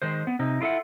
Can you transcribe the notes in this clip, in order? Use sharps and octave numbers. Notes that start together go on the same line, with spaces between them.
D#3 G#3 C5
B3
C3 D#4
E4 F4 A4 E5 F#5